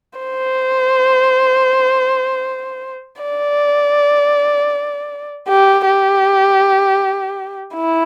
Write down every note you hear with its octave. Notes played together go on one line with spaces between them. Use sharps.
C5
D5
G4
G4
E4